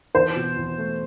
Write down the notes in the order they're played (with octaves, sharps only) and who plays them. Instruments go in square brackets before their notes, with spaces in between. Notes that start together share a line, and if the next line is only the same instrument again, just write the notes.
[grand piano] E2 [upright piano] C5
[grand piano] B2
E2
A3